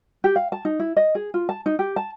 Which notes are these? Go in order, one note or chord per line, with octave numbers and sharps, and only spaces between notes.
G4
F5
A5
D#4
E4
D#5
G#4
F4
A5
D#4
G4
A5